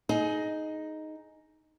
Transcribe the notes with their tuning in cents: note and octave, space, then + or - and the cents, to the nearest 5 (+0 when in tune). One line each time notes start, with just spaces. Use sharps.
D#4 +0 G#4 +25